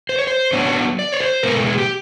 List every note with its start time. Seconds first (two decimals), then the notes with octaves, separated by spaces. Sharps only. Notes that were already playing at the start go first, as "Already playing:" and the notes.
0.09 C5
0.18 C#5
0.27 C5
0.53 F#3 B3 D4 C#5
0.99 D5
1.12 C#5
1.20 C5
1.43 B2 G#3 B3 A#4
1.54 A4
1.66 G#4
1.78 G4